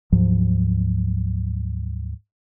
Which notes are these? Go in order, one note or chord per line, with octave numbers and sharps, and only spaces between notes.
D2 G#2 F3 F#3